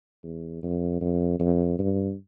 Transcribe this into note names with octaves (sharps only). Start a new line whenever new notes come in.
E2
F2
F2
F2
G2